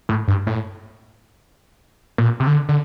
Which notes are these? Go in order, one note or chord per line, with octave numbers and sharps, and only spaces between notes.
A2
G2
A2
A#2
C3
D3
D3